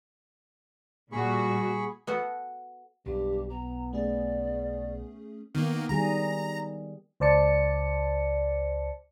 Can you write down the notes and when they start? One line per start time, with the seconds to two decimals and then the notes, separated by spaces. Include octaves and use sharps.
1.12 A#2 G3 F#4 G#4 B5 C#6
2.07 B3 F#4 A4 F#5
3.06 B1 G2 G4
3.50 B3 A#5
3.93 A3 C#4 G#4 D5
5.55 D#3 A#3 B3
5.89 D#3 G3 G#4 A#5
7.20 C#2 C5 D5 A5 C#7